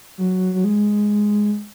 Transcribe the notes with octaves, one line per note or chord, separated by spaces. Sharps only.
F#3
F#3
G#3